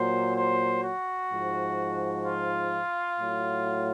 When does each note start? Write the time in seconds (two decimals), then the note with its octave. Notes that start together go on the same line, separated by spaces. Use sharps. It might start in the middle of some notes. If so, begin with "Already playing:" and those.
Already playing: A#2 F#3 C5
0.35 C5
0.82 F#4
1.30 G#2 F3
2.24 F4
3.19 A2 F#3